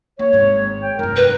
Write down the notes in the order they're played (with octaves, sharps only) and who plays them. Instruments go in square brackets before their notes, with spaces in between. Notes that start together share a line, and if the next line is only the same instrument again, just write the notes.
[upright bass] A#3 [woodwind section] C#5
[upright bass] G#1 G#2
[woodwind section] G5
[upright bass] F1 G2 [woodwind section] A#4
[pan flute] B4